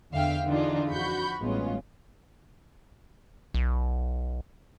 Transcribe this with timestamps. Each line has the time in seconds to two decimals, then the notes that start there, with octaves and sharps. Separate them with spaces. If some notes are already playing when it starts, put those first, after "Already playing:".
0.11 E2 D3 E5 F5 G5 F6
0.46 D3 E3 D4 D#4 F4 G#4
0.92 F2 F#4 B5 C#6 G6
1.41 A1 G2 G#3 B3 C#4 F4
3.54 B1